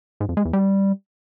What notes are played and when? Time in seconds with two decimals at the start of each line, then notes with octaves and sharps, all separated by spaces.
0.20 G#2
0.29 F2
0.37 G#3
0.45 E2
0.53 G3